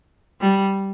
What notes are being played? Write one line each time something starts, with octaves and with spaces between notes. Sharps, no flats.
G3